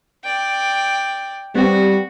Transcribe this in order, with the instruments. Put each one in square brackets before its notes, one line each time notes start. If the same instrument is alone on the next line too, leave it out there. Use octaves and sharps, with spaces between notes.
[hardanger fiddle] D5 G5
[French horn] G3 [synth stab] B3 C4 G4 [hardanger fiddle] F#4